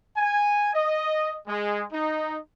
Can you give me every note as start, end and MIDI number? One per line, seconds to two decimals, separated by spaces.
0.16 0.72 80
0.73 1.35 75
1.46 1.83 56
1.92 2.38 63